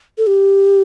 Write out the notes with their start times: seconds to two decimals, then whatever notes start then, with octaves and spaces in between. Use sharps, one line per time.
0.18 A4
0.27 G4